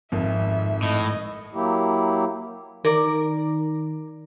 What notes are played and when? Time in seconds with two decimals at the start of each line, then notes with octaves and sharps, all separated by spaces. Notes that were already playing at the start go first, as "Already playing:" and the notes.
0.12 G#1 F2 G#2 E5
0.83 A2 D#5
1.54 F#3 A#3 E4 G4
2.85 D#3 A#4 D5